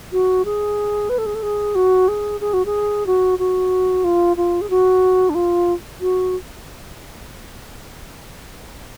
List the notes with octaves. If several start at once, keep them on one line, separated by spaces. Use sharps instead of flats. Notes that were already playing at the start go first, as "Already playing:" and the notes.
F#4
G#4
B4
A4
G#4
A4
G#4
F#4
G#4
G#4
F#4
G#4
F#4
F#4
F4
F4
G#4
F#4
D4
F4
F#4